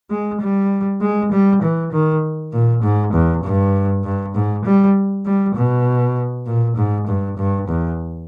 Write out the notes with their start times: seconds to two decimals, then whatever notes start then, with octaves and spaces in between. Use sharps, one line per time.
0.11 G#3
0.41 G3
1.01 G#3
1.32 G3
1.62 E3
1.92 D#3
2.53 A#2
2.83 G#2
3.13 E2
3.44 G2
4.04 G2
4.35 G#2
4.65 G3
5.26 G3
5.56 B2
6.46 A#2
6.77 G#2
7.07 G2
7.38 G2
7.68 E2